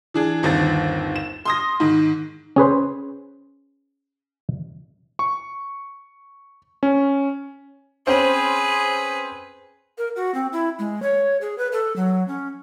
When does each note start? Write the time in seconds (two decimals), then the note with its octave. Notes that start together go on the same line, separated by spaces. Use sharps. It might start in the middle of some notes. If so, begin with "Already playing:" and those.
0.14 E3 D4 G#4
0.43 G1 D#2 C4 A6
1.16 E7
1.45 C6 D#6 A#6
1.80 G#2 D#3
2.56 C#4 G#4 B4 C5
5.19 C#6
6.83 C#4
8.07 C4 C#4 G#4 B4 C5
9.98 A#4
10.16 F#4
10.35 C4
10.53 E4
10.79 G#3
11.02 C#5
11.41 G#4
11.58 B4
11.72 A4
11.96 F#3
12.28 C#4